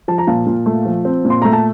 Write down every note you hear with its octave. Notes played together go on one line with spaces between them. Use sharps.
F3 A5
A#5
A#2 F5 A5
A#2
A3
F3
C4
A#2
C6
A3 A#5
A5